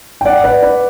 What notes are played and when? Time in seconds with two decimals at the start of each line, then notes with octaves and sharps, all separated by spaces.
0.21 G5
0.25 D5 F#5
0.44 B4 D5
0.62 B4 D5